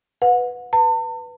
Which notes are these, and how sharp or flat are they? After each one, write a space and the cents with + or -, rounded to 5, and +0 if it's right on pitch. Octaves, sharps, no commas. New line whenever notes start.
B4 +5 F#5 -30
B4 +0 A5 +45